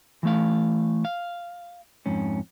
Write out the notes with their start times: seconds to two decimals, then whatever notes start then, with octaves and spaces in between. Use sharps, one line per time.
0.23 E3 A3 F5
1.05 F5
2.06 F2 G#2 C#4